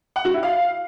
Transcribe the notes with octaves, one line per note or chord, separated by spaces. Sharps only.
F#5
F#4
E4
F5